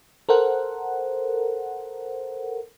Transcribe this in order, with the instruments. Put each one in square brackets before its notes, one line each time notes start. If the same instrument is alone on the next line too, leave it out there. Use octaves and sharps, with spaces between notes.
[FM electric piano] A4 A#4 C5 F#5